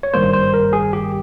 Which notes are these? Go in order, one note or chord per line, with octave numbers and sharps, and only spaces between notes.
C#5
G#1 G2 D#3 G3 A#3 C5
C5
A#4
G#4
G4